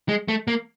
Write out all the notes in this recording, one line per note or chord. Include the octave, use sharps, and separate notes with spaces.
G#3
A3
A#3